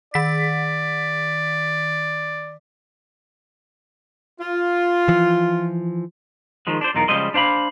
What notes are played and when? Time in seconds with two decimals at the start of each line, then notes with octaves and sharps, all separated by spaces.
0.14 D#3 D5 B6
4.40 F4
5.08 E3 F3
6.67 D#3 F3 G#3
6.81 D4 C5
6.95 B1 E2 D#4 F4 A#4
7.08 C#3 F3 G3 G#3 D#5 C6
7.34 D4 C5 F5 B5